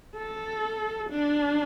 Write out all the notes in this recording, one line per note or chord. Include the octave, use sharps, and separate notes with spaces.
A4
D4